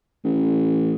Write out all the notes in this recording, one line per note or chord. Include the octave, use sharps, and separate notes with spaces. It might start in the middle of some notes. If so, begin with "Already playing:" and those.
A1